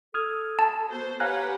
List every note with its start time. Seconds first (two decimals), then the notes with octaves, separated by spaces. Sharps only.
0.14 A4 D#6 F6 G#6
0.59 A5
0.89 B3 F#4 C5
1.20 G4 B4 C#5 F5 F#5 G#5 A#5 F#6